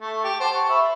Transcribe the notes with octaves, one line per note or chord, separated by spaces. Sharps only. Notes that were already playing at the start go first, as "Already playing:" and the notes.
A3
G4
C5 F#5 A5
C#6
E5 B5